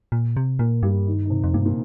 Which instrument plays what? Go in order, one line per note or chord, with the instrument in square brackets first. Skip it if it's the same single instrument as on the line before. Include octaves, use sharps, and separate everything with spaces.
[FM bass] A#2
C3
[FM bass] A#2 [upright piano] A#3
[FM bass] G2 [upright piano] G3
[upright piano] D#3
D#3
C3
[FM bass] F2
[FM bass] G2 [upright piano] A#2
[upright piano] A#2